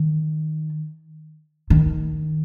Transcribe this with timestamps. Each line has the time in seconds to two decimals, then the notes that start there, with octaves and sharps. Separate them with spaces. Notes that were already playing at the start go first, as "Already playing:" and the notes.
Already playing: D#3
1.70 D#3